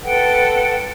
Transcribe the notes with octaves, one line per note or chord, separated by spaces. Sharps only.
A4 B4 F#5 G5